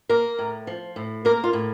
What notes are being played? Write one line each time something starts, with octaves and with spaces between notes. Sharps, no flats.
A#3 A#4
A2
F3
A2
A#3 A#4
F4
A2